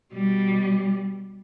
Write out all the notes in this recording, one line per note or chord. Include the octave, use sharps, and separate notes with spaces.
B2 G3